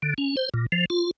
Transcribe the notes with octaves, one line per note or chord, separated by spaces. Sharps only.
D3
C#4
C5
A#2
F3
F4